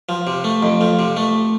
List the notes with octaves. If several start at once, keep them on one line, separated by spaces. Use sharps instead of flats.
F3
C3
A3
F2
F3
C3
A3